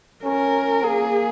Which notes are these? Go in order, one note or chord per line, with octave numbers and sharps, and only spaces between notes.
C#4 A#4
A#3 G#4